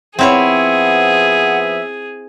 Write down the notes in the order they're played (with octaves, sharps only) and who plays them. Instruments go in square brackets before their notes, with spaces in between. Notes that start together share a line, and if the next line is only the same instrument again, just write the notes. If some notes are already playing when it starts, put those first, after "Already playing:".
[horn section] F3 B3 E5 [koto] C4 E4 C#5 [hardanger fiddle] G#4 [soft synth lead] F#5